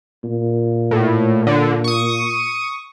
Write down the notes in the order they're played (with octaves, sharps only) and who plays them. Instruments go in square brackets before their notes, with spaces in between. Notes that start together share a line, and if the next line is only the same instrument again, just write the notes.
[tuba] A#2
[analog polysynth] A2
D3
C#6 D#6